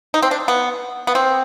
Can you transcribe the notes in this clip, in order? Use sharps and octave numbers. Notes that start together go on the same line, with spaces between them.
D#4
C4
D4
B3
B3
C4